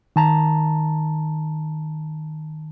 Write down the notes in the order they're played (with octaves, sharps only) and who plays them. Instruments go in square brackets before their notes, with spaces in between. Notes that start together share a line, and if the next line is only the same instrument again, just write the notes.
[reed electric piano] D#3 A5 A#5